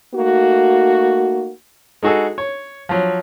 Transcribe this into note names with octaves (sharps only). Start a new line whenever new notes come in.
A3 A#3 D#4 F#4
G#3 D#4 F#4 G#4 A4
C#5
F3 F#3